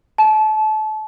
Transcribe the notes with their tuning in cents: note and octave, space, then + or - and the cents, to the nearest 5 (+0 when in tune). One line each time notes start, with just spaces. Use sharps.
A5 -30